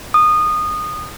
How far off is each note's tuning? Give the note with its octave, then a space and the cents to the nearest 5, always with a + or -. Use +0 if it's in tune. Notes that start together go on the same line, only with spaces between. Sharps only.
D#6 -20